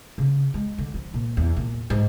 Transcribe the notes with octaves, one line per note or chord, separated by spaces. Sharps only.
C#3
G#3
D3
F3
A#2
E2
A#2
G#2